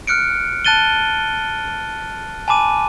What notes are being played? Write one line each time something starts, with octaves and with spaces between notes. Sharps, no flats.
F6 F#6 C#7 D7
A5 F#6 A6 D#7 G7
G#5 A5 B5 D6 D#7